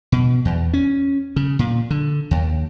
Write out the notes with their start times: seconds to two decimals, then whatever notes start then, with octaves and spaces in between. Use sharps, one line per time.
0.12 B2
0.45 E2
0.73 C#4
1.36 C#3
1.59 A#2
1.91 D3
2.31 D#2